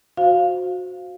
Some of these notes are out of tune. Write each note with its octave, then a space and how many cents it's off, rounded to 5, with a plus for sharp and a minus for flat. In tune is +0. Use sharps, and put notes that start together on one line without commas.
F#4 -20 C5 +0 F5 +0